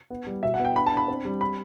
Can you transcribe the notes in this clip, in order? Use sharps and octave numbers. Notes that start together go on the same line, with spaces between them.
B3
G3
B2 E5
F#5
B3
G5
D4 B5
A5
D4 B5
C4
G3
B5